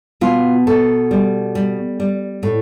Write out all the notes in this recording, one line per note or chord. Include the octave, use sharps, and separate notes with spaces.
B2 F4
B2 A4
G3
G3
G3
A2